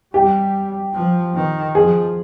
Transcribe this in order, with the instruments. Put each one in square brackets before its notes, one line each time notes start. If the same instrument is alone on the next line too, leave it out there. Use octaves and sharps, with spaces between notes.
[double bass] G3 [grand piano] G4
[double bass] F3
D#3
[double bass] F3 [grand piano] G#4